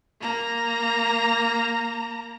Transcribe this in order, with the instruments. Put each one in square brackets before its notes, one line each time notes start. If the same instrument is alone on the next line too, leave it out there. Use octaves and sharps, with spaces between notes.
[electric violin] A#3 A#5